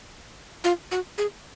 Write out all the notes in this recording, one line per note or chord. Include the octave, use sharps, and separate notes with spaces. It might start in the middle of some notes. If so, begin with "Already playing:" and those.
F4
F#4
G#4